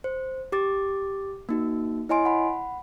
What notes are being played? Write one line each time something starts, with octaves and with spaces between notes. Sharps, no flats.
C5
G4 D6 A6
A#3 D#4 F#4
E4 C#5 D#5 G#5 C6 D7
F#5 B5